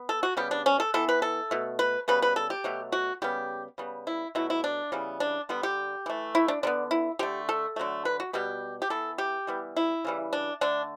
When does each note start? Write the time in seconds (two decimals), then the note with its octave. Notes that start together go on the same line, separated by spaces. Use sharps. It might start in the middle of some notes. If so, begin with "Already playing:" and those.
Already playing: B3
0.09 A4
0.23 F#4
0.37 C#3 G3 B3 G4
0.51 D4
0.66 C#4
0.80 A4
0.94 E3 B3 A4
1.09 B4
1.22 A4
1.51 B2 A3
1.79 B4
2.08 C#3 G3 B3 B4
2.22 B4
2.36 A4
2.50 G4
2.64 B2 F#3 A3
2.92 F#4
3.22 C#3 G3 B3 G4
3.78 C#3 G3 B3
4.07 E4
4.35 B2 F#3 A3 E4
4.50 E4
4.64 D4
4.92 C#3 E3 G3 B3
5.20 D4
5.49 D3 G3 B3
5.63 G4
6.06 E3 A3
6.35 E4
6.48 D4
6.63 D3 G3 B3 D4
6.91 E4
7.19 D3 A3 G4
7.49 A4
7.76 D3 F#3 A3
8.05 B4
8.20 F#4
8.33 B2 G3 B3 G4
8.82 G4
8.90 E3 B3 A4
9.18 G4
9.47 E3 G3 B3
9.76 E4
10.05 C#3 E3 G3
10.33 D4
10.61 D3 A3 D4